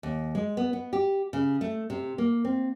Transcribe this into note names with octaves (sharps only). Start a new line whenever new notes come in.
D#2
G#3
B3
B3
G4
C#3
A3
C3
A#3
C4